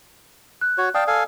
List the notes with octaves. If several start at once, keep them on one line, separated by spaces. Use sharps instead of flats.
F#6
F#4 C#5
D5 F5 G5 A5 D#6
A4 F5 G#5